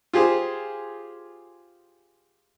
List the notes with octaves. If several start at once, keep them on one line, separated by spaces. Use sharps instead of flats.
F4 G4 G#4 C5